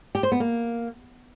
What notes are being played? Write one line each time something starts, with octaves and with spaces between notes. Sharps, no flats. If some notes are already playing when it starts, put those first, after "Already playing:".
G4
C5
B3
A#3